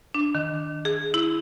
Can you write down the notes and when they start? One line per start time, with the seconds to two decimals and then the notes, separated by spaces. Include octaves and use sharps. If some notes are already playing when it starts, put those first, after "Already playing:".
0.14 D4
0.35 D#3
0.85 G#4
1.14 E4